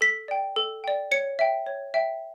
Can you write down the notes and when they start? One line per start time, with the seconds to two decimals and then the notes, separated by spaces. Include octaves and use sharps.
0.01 A4 B6
0.28 D5 G5
0.56 A4
0.84 D5 G5
1.11 C#5 C#7
1.39 E5 G5
1.66 C#5
1.94 E5 G5